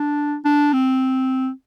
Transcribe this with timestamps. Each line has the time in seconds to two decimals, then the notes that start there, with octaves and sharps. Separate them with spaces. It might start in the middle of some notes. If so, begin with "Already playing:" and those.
Already playing: D4
0.45 D4
0.73 C4